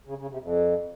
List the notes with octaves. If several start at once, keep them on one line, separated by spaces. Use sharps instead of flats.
C#3
C#3
C3
F2